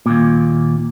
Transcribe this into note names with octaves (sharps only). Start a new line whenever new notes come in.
D#2 A#2